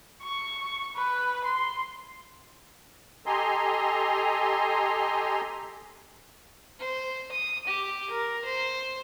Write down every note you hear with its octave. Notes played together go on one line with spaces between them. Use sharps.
C#6
B4
C6
G4 A4 D#5 G#5 A#5 C6
C5
D#6
G4
A#4
C5